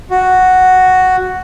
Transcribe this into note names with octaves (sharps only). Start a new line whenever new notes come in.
F#4